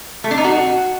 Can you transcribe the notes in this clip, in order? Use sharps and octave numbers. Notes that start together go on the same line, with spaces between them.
A3
D4
D#4
F#4